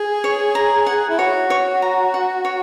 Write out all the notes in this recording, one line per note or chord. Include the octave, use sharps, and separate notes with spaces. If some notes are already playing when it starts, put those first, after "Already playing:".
Already playing: G#4
C#5
A#5
F#5
E4
F#4 C#5
C#5
A#5
F#5
C#5